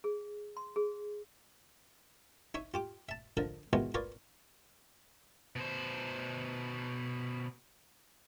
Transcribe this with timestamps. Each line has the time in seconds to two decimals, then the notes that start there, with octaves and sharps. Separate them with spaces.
0.04 G#4
0.57 C6
0.76 G#4
2.54 D#4 C#5 E5
2.74 F4 G4 D6
3.09 E5 A5
3.37 D3 F3 A#4 D#5 A#5
3.73 B2 D#3 E3 G#3 B3 F4
3.94 F4 A#4 B4 C#5 D5 F5
5.56 B2 C5